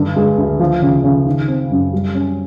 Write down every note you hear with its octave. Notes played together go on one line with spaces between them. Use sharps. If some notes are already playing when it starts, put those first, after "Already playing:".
Already playing: G2 D3
G#3
D2
F3
C#3
C#3
D#3
C4
F#2
G3
C#4